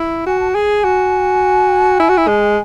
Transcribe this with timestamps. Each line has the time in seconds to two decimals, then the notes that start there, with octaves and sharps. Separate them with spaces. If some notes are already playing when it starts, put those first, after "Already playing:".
Already playing: E4
0.27 F#4 G#5
0.40 A5
0.52 G#4 G#5
0.84 F#4
2.00 E4
2.09 F#4
2.18 E4
2.28 G#3